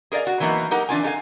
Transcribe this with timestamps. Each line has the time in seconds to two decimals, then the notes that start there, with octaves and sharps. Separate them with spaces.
0.12 G#4 A#4 D5 D#5 F5
0.27 F#4
0.40 E3 F#3 A#3 B3 D#4
0.71 D#4 G4 A#4 F#5
0.89 E3 D4 F4 G#5
1.03 D#4 F#4 A4 F5 G#5